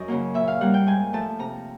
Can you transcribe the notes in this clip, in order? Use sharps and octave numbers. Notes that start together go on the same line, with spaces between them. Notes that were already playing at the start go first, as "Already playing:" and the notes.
Already playing: F#2 D#5
C#3 F#3 A#3
A#2 E5
F5
G3 A#3 F#5
G5
G#2 G#5
F3 A3 A5
C3 A#5